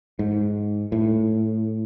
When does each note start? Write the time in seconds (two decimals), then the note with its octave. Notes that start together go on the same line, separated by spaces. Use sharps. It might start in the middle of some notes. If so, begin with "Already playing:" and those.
0.19 G#2
0.92 A2